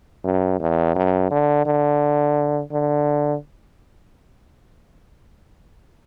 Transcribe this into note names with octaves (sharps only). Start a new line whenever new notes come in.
F#2
E2
F#2
D3
D3
D3